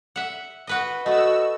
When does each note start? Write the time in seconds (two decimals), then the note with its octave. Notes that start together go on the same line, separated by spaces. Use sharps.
0.16 E5 F#5
0.67 F#4 B4 D#5
1.06 A3 F#4 D#5 E6